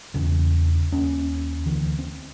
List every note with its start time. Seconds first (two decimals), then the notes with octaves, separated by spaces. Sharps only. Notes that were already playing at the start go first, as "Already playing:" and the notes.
0.14 E1 E2 C#3
0.92 D#2 C#4
1.66 D2 E3
1.99 C4